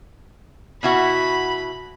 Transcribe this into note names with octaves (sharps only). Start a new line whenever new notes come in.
B2 E4 F#4 B5